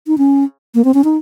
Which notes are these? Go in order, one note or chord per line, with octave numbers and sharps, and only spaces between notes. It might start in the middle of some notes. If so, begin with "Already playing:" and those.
D#4
C#4
A#3
C4
C#4
D#4